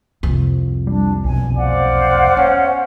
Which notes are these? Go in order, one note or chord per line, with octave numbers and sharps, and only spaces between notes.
C2 F2
G3 D4
B1 E2 B2 G#5
C5 D5 F5 F#5
B3 C#4